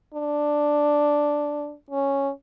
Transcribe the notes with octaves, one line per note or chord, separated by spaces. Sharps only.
D4
C#4